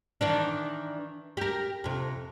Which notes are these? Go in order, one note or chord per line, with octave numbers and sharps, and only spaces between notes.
D#3 E3 D4
G4 A#4
F2 C3